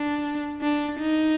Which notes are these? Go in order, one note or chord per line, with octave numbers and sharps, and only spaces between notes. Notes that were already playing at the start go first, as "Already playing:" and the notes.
Already playing: D4
D4
D#4